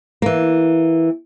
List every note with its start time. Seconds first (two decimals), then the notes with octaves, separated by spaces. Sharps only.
0.22 E3 A#3